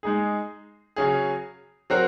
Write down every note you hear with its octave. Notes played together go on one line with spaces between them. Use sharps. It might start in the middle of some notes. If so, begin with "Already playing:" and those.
G#3 D#4 G#4
C#3 F#3 C#4 G#4
F#3 C4 F#4 A#4